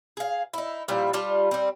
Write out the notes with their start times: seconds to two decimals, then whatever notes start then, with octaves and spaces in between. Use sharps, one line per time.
0.17 G#4 F5
0.53 D#4 E4
0.88 A#2 F3 G3 E4
1.13 G3 F4 A5
1.51 G3 C4